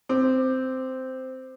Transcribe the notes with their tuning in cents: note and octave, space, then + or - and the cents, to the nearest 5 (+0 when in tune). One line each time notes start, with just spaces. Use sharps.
C4 -10 D6 +20